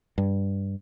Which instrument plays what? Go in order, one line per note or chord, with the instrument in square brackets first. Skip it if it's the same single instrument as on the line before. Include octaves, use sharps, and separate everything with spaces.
[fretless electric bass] G2